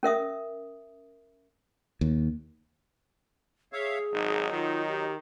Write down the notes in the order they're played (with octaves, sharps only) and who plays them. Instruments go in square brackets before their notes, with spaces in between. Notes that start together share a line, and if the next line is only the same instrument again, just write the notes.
[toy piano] C#4 A#4 E5 D#6
[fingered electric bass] D#2
[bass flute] G#4 [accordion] C#5 E5 F5
[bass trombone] G#1 [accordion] F#3 D#4
[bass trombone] D#3 [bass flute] F4
[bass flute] G4